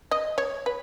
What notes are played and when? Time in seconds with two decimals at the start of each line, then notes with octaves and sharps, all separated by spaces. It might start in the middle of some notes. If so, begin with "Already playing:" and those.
0.11 D#5
0.38 C#5
0.66 B4